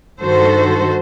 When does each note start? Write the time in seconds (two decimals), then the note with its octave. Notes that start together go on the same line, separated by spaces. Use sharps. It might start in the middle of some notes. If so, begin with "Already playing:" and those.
0.21 G2 D#3 F#4 A4 C5